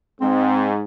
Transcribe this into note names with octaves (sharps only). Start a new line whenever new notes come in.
G#2 C4